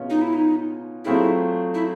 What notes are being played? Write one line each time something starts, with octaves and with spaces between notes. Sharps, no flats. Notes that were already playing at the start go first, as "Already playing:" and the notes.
Already playing: B2 G#3 C#4 F4
D#4
E4
D#4
F#3 A3 C4 E4 F4 G#4
E4